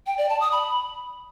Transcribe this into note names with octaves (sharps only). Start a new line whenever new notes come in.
G5
D5
A5
D#6
B5